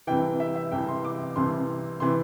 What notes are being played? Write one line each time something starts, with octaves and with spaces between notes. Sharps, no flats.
C2 C3 E3 G5
E5
E5
C2 C3 E3 G5
C6
D6
C2 C3 E3 C6
C3 E3 C6